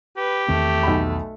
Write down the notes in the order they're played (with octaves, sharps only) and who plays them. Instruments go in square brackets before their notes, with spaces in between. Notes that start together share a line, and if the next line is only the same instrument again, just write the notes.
[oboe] G4 [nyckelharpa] B4
[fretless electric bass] E2 D#3 C4 [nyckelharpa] A3
[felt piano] B1 B5